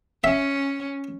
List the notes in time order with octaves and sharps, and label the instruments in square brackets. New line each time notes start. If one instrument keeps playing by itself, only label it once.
[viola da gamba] C#4 [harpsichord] E5